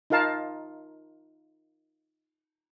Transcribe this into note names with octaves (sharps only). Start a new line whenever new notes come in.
D#4 F4 A#4 F5 A5